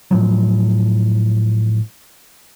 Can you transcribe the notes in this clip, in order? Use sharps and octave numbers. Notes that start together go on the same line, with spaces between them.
A2 F3 F#3